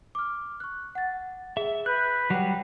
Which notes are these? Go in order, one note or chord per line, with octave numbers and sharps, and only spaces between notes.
D6 F6
C#6 F#6
F#5 A6
G#4 E5
B4 F#6 G6
F#3 G3 F#5 G5